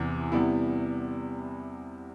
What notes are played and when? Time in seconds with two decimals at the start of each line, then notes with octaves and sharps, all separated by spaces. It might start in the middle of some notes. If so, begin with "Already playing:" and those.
Already playing: E2 C3 E3 B3 E4
0.32 C3 G3 B3 E4